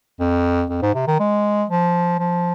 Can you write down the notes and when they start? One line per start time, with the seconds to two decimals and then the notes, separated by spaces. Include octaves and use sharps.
0.19 F2
0.70 F2
0.82 G#2
0.95 C3
1.07 D#3
1.19 G#3
1.70 F3
2.19 F3